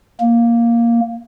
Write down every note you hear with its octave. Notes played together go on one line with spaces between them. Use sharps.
A#3